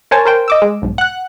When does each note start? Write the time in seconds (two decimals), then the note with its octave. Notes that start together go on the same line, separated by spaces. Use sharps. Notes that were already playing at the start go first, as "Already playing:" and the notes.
0.11 A#4 C5 C#5 G#5 A5
0.25 A#4 C5 G5
0.48 D#5 D6 E6
0.62 G#3
0.82 B1 G#2
0.98 F#5 F#6